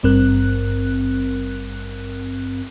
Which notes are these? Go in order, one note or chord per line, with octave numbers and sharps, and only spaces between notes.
G#1 G2 C4 A#4 F#6